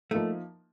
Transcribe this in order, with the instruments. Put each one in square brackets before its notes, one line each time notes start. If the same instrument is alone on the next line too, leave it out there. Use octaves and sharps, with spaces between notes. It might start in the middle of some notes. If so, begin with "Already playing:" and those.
[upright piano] F3 A#3 D#4 [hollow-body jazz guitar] A3